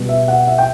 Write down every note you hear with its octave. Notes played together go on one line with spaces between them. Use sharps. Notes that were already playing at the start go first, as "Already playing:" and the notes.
Already playing: B2 G3
E5
F#5
E5
G5